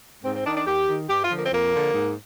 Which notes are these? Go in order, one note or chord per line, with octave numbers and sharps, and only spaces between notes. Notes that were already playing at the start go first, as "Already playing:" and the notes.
G#2 C4
C4
D#3 D4
D4
D#2 G4
D#3
G2 G4
F4
D3 F3
A#3
C4
F2 A#3
D3 F3
G#2